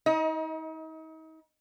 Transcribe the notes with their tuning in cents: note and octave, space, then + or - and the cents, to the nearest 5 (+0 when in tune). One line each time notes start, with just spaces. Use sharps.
D#4 +40 D#5 +20